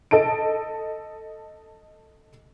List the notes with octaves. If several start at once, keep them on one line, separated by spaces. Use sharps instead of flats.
A4 D#5 A5 D7